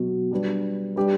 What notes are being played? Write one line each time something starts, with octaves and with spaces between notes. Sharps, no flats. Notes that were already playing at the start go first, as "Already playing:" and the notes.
Already playing: B2 F#3 B3 F#4
G3 D4 G4 B4
G3 D4 G4 B4